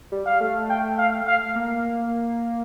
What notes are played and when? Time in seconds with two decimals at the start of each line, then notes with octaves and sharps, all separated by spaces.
0.12 G3
0.26 F5
0.40 A3
0.70 G5
0.98 F5
1.27 F5
1.55 A#3